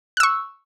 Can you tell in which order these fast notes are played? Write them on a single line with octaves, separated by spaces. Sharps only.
F#6 E6 C#6